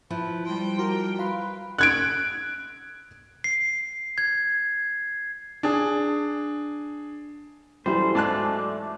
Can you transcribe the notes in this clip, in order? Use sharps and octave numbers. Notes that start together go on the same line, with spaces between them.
F3 E4 B4
G3 C5 G5
F#4 A#4
B4 F5 B5 C6
F#6 G#6 D7
C7
G#6
D4 G#4
E3 F#3 G3 A3 C5
G#2 D5 A5 F#6